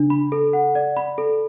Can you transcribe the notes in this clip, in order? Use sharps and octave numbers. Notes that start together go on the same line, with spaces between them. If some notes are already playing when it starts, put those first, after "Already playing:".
Already playing: C#3 D4
B5
A4
F#5
D5
B5
A4